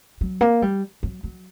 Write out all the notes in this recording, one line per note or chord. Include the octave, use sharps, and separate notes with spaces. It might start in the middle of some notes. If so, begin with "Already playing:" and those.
F#3
A#3
G3
F#3
F#3